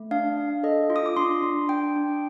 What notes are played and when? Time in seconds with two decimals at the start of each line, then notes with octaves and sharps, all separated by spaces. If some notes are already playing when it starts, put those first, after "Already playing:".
Already playing: A3
0.11 D4 F5
0.37 D4
0.63 A4 D#5
0.90 F4
0.96 D#6
1.06 D6
1.16 D4 C6
1.42 D4
1.69 D4 G5
1.96 D4